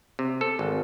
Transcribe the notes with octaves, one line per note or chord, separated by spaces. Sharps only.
C3
A4
G#1